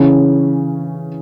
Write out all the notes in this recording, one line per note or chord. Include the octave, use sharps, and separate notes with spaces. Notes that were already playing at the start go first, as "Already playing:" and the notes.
Already playing: C#3 E3 C#4